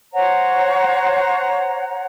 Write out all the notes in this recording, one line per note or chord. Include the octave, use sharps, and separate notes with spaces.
C5 C#5 F#5 A#5